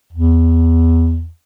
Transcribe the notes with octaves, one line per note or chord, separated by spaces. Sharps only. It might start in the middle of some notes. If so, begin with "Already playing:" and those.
E2